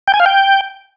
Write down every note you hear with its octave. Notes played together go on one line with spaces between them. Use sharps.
G5
G#5
F5
G5